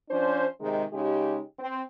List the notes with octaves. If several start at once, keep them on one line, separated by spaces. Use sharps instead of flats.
F3 C#4 D4 C5
C3 D#3 G#3
C#3 G#3 D#4 G4
C4